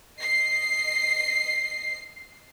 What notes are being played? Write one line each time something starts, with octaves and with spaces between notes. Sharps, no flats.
D#5 C7